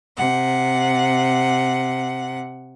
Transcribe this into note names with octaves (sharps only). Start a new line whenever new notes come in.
C3 F#5